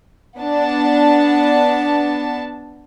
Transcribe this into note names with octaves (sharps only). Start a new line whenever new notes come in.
B3 D4 A5